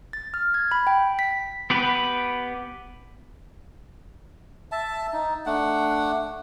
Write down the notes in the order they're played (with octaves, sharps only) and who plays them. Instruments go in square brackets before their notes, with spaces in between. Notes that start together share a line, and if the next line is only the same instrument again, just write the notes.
[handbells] A6
F6
G#6
B5
G5
B6
[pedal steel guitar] B3 G4 B4
[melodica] E5 A5
D#4
A3 D4 F#5